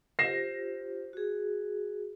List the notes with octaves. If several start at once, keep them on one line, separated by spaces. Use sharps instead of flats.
F4 G4 C5 A#6 C7 E7
F#4 G#4